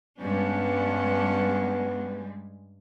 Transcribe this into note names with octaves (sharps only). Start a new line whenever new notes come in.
G2 G3 G#3 B3 C#4 D4